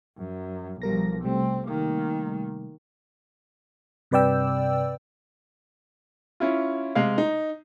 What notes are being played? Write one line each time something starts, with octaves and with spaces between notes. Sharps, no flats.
F#2
B1 F3 G3 A#4 A#6
C3 G3 A3 C4
D#3 A#3
G2 C3 B4 D5 G5 E6
C#4 E4 F4
C3 G#3 F5
D#4